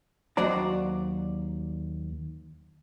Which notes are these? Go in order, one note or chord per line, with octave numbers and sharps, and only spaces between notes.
D#2 F#3 C5 D5 A#5